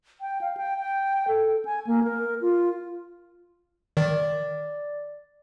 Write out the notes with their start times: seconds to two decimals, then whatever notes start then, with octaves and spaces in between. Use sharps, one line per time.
0.21 G5
0.41 F5
0.57 G5
0.80 G5
1.28 A4
1.65 G#5
1.87 A#3
2.04 A#4
2.42 F4
3.97 D#3 D5